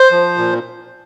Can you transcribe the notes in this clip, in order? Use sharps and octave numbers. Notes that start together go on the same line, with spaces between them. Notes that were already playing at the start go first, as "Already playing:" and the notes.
Already playing: C5
F3
A#2